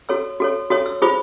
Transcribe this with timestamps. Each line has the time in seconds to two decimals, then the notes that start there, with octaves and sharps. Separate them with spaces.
0.09 F#4 A4 C#5 E6
0.40 F#4 A4 C#5
0.70 F#4 A4 C#5 D#6
0.86 E6
1.02 F4 G#4 C5 D#6